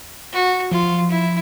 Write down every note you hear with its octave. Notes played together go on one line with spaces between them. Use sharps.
F#4
F3 F4
E4